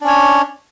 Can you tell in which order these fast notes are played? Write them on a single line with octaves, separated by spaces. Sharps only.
D4 C#4 C#5